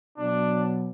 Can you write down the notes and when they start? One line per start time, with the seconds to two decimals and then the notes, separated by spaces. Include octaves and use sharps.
0.18 B2 F#3 D4